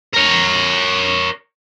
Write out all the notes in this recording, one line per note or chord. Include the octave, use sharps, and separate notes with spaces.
A#4 C#5